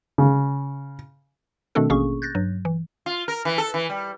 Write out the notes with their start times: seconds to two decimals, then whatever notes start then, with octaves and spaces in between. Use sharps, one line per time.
0.18 C#3
1.75 B2 D#3 A3 C4 D4 A4
1.90 A1 B2 A#3 C#4 G#4 C#6
2.22 F#6 G6 A6 A#6
2.35 G2 F#3
2.65 E3
3.06 F4
3.28 A#4
3.45 E3
3.58 A4
3.74 E3
3.89 G3